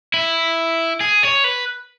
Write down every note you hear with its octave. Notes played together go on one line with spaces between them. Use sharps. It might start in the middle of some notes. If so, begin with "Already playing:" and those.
E4
G#4
C#5
B4